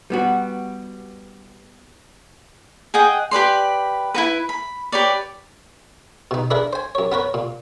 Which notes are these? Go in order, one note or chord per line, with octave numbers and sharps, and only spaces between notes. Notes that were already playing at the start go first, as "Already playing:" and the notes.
G3 B3 F#4
G#4 D#5 F#5 G5
G4 B4 D5 C6
E4 F#4 B4
B5
G4 B4 C#5 D5
B2 D#4
D4 E4 G#4 A#4 B4
C5 G#5
F#2 C#5
B3 A#4 B4 C#5
A#2